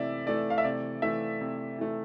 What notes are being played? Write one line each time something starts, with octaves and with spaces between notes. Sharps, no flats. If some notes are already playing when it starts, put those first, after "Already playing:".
Already playing: C3 E3 A3 D5 E5
E3 A3 D5
F5
E5
C3 D5
E3 A3 E5
C3
E3 A3